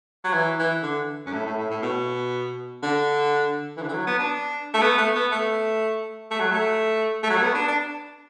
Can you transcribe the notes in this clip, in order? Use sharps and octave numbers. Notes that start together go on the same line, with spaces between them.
F#3
E3
E3
D3
F#2
A2
A2
A2
A2
B2
D3
E3
D3
E3
F#3
B3
D4
A3
B3
A3
B3
A3
A3
F#3
A3
A3
F#3
A3
B3
D4
D4